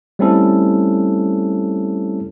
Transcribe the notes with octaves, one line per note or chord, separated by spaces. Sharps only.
G3 A3 C4 C#4 E4 A4